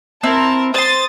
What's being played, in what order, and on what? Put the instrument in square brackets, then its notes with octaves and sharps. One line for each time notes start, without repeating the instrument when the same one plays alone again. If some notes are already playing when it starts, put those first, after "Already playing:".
[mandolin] C4 E4 [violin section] A#4 A5
[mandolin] C5 C6 [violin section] D#6 A6